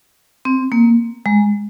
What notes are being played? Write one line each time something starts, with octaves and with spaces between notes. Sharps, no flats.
C4
A#3
G#3